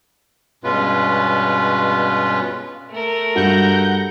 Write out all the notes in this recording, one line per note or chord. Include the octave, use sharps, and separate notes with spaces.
G2 B2 G#3 C#4 F4 B4
A3 A#4
G2 F#4 F#5 G6 A#6